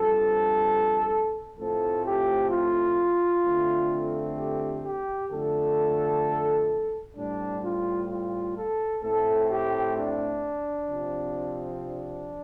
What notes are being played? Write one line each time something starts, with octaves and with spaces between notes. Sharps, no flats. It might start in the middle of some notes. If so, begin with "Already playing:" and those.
Already playing: G2 F3 C4 A4
A2 F3 A3 C4 A4
G4
F4
F2 D3 A3 C4
G4
G4
F2 D3 A3 A4
A2 G3 C4 D4
F4
F4
A4
A2 A3 C4 A4
G4
D4
C3 F3 C4
D4